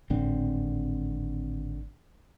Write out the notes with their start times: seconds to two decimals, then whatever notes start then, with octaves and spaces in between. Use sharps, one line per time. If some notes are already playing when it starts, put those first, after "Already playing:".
0.10 G#1 A2 D3 C4